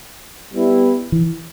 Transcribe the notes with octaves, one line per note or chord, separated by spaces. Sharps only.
G3 B3 E4
E3